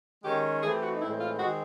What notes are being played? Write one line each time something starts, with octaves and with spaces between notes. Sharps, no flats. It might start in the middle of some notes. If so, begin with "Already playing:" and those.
D#3 G#3 C#4 G4
E3 A3 C4 G#4
G4
F#4
D#4
A2 E3 G#3 C4 E4
F4
D#3 G#3 C4 F#4